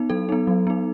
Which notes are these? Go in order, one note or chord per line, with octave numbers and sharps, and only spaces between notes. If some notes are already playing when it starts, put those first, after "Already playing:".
Already playing: B3 D#4
F#3 A4
B3 D#4
F#3
B3 D#4